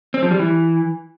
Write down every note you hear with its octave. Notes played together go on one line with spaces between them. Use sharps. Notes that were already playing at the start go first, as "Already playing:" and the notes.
C4
F3
G3
E3